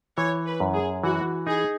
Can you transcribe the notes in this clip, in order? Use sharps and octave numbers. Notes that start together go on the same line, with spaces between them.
E3 C#5
B4
F#2
G#4
E3 F#4
D#4 G#4